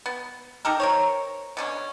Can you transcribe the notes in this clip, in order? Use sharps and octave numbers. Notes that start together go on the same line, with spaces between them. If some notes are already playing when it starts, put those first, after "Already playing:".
B3
D#4 G4 A4 A#4
A#4 C5 C#5
B2 D3 C#4